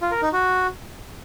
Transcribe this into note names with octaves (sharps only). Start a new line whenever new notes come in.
F4
A#4
D#4
F#4